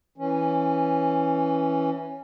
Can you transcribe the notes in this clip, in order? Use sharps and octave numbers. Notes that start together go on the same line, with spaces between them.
E3 C#4